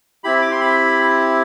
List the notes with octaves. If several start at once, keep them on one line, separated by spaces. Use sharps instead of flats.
C4 E4 G4 B5
D6
C6
B5